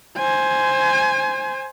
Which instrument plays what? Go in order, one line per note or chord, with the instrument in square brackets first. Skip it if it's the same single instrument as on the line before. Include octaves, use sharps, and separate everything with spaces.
[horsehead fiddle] C5 G#5